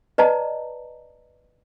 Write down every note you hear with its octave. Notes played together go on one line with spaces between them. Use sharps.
B4 D5 D#5 A5 A#5